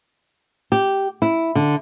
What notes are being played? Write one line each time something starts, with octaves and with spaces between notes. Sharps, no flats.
G4
E4
D3